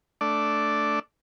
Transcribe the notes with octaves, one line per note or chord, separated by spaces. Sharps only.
A3 D4 D5